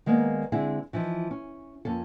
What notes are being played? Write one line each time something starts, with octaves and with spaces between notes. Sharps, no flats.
D#3 G#3 A#3 B3 D5
D3 G#3 C4 E4 G#4
E3 F3 D#4
C#4
F2 A#3 C#4 A4